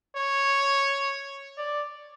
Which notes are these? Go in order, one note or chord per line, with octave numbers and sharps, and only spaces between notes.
C#5
D5